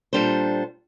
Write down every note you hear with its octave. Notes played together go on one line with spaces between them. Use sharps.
A#2 G3 D4 A4 C5